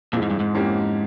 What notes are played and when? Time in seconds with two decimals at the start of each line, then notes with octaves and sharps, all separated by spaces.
0.13 F2 A#2 E3 G#3
0.22 G#2
0.31 G2
0.40 G#2
0.54 F2 E3 A#3 C#4 G4